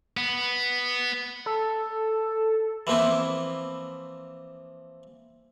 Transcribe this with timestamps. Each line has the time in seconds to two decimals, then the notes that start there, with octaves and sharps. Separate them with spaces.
0.17 B3
1.46 A4
2.87 E3 F3 A#3 C4 E4